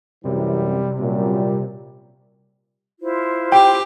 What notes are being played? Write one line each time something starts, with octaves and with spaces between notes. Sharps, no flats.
F#2 C3 E3 G3
F#2 A#2 G3
E4 F4 C5
G4 G5